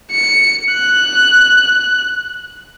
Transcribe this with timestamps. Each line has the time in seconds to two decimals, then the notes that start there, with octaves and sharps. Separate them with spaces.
0.12 C#7
0.73 F#6